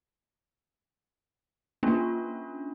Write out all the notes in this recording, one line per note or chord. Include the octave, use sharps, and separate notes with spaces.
A#3 C#4 D4 F4